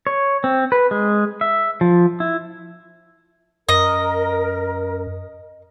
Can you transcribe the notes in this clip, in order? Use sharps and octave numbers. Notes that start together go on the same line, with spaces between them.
C#5
C4
B4
G#3
E5
F3
E4
F#2 A#4 D#5